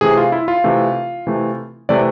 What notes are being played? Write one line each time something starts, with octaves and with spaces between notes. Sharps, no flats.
C3 E3 A3 G#4
F4
E4
F4
C3 E3 A3
C3 E3 A3
C3 E3 A3 D5